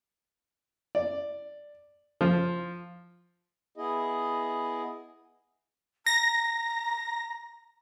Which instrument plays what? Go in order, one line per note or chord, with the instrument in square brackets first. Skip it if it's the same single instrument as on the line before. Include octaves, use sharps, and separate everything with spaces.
[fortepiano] D5
F3
[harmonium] B3 E4 G#4 D#5
[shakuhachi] A#5 [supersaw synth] A#6